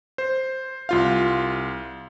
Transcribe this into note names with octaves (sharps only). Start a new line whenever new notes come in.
C5
C2 F4 F5